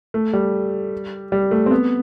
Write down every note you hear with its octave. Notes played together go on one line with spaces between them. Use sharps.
A3
G3
G3
A3
C4
B3